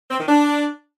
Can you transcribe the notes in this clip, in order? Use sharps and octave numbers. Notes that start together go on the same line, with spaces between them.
C4
D#3
D4